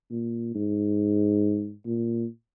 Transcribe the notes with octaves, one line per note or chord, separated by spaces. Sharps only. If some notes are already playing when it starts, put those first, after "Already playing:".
A#2
G#2
A#2